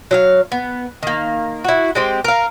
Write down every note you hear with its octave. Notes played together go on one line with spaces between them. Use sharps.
F#3 E5 F5
B3
D#3 A#3
E4 F#4
G#3 C4 G4
A#4 F5